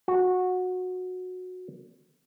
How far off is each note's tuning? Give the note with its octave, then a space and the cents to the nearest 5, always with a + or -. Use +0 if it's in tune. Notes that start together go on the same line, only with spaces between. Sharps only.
F#4 -15